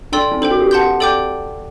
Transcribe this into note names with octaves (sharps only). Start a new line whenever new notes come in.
D4 A4 D5 G5 C6 E6
C4
D4 A4 C5 G5
F#4
G4
F#5 A5 C6 G6
A4 D5 G5 D6 G6